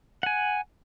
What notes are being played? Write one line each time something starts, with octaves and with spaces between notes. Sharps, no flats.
F#5 G#5